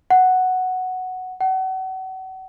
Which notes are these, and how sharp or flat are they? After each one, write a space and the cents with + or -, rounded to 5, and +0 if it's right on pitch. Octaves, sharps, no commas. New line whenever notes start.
F#5 +0
F#5 +35